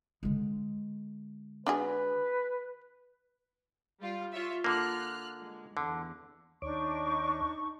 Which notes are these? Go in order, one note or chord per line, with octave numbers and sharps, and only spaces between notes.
D3 G#3
D4 F#4 G#4 B4
G3 F4
F4 C#5 E5
D3 A#3 F4 F6 F#6
G#3
E2 D3
D#2 D4 D#4 C#5 C#6 D6